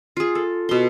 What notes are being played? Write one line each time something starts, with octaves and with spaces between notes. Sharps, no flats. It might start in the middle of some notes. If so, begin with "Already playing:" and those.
F4 G#4
A4
B2 C6